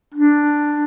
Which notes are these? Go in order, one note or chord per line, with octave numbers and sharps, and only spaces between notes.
D4